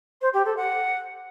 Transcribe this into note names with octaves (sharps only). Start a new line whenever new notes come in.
C5
G4
A4
F#5